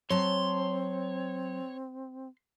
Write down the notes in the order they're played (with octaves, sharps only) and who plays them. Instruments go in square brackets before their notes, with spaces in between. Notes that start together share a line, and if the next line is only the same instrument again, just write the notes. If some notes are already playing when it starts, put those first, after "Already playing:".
[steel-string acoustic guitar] F#3 A5 [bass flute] C4 [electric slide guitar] C#5 [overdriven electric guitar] C6